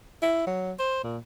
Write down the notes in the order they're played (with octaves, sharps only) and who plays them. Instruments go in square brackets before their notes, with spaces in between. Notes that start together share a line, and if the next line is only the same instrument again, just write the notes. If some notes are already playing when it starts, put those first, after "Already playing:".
[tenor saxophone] E4
F#3
C5
A#2